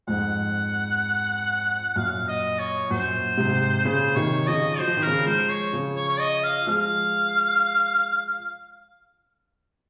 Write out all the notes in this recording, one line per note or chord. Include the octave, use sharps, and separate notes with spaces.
F2 G#2 F#5
F#2 A#2 F5
D#5
C#5
F#2 A#2 C5
G#2 C3
A#2 C#3 C5
C3 D#3 C#5
C#3 F3 D#5
F#3 C5
F3
D#3
C#3 F3 A#4
F3 G#3 C5
C#5
C#3 F3
C#5
C#5
D#5
F5
F3 G#3 F5